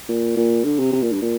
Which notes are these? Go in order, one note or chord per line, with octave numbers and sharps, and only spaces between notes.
A#2
A#2
D3
C3
C3
A#2
G2
A#2